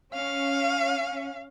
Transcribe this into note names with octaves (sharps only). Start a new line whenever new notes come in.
C#4 F5